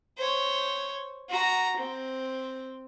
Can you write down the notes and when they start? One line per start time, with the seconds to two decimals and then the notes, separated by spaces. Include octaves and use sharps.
0.18 C5 C#5
1.29 F#4 A#5
1.77 C4